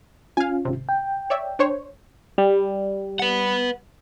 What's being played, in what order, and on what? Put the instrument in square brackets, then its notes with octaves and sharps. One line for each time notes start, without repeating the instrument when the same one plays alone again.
[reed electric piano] C#4 F4 [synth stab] F5 G#5
[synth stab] G#1 C3
[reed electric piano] G5
[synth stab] C#5 D5 E5
D4 C5 C#5
[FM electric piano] G3
[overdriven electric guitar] B4 F#5